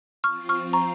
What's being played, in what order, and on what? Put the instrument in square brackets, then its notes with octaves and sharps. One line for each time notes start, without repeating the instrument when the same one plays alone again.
[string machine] F3 C4 F4 [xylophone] C#6 F6
[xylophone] C#6 F6
A#5 C#6